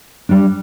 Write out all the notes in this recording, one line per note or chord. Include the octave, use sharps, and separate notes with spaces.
G3 D4